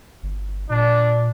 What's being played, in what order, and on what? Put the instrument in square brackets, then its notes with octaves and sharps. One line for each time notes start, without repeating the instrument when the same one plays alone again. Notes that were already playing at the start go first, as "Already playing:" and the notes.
[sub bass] G1
[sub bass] A#2 [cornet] D4